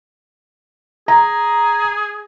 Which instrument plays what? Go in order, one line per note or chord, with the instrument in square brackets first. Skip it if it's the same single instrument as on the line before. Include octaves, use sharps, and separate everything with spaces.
[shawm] G#4 [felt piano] A#5